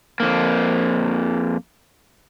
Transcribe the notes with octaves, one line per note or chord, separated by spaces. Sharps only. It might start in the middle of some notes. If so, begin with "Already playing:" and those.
F2 A#3